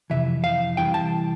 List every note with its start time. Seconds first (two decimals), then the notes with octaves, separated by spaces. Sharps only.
0.10 F2 C3 E3 E5
0.44 F5
0.77 C2 C3 E3 G5
0.94 A5